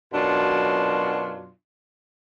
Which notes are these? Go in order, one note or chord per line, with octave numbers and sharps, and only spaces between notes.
F#2 B2 F#3 D4 F4 C6